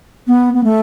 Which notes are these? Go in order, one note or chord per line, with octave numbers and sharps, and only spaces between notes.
B3
B3
A3